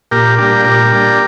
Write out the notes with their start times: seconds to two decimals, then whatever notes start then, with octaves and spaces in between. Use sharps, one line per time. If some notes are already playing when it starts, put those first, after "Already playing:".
0.11 A#2 G4 A#4
0.38 G3 A#3 D4 G4 A#4
0.65 A#2 G4 A#4
0.92 G3 A#3 D4